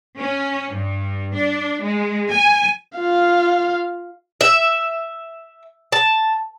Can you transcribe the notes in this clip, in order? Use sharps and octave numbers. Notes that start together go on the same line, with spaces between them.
C#4
G2
D4
G#3
G#5
F4 F5
E5
A5